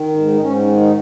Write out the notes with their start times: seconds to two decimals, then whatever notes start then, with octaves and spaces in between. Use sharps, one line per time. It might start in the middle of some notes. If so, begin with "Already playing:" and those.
Already playing: D#3
0.14 G#2
0.34 D#4
0.41 G#2 C#4
0.67 D#3
0.80 D#4